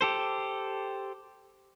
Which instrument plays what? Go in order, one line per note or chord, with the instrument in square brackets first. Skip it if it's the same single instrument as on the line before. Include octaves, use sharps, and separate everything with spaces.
[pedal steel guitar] G4 A4 C5